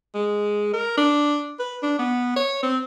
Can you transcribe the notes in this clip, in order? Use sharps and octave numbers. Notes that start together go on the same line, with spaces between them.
G#3
A#4
D4
B4
D4
B3
C#5
C4